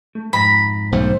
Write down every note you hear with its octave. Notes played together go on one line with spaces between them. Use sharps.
A3
F2 G#2 A#5 B5
B1 D3 A3 C5